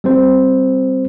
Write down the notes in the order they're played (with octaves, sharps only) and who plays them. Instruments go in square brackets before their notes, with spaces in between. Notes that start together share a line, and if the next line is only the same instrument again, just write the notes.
[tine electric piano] G3 C4 C5